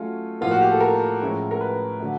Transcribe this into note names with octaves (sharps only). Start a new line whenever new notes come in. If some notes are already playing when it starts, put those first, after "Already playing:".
Already playing: F#3 A3 C#4 F4
A2 F3 A#3 F4
F#4
G4
A4
A#4
A2 F3 G#3 C#4 E4
A#4
B4
D3 F#3 A3